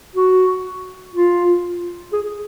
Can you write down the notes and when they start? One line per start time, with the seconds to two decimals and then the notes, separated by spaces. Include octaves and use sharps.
0.16 F#4
1.14 F4
2.12 G#4